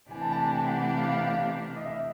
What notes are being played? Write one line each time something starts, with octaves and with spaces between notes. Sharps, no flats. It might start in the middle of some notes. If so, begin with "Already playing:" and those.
C3 E3 A3 D4 G4 G#5
A5
A5
G#5
G5
F#5
F5
F5
F5
D#5
E5